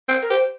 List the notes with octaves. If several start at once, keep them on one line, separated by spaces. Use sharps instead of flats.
C4
A#4
G4 C5